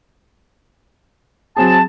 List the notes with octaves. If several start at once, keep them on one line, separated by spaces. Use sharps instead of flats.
F#3 C4 G#4 A5